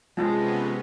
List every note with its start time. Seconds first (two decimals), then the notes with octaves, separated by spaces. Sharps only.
0.17 C3 F3 G#3 B3 C#4